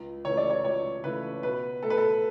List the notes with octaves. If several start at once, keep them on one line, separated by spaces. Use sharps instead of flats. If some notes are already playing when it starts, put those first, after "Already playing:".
Already playing: C#2
C#3 E3 A3 C#5
D5
C#5
C#2 C#5
C#3 E3 A3 B4
B2 B4
A3 A4
B4
A4